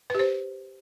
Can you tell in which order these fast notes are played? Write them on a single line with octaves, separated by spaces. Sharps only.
B4 G4 C5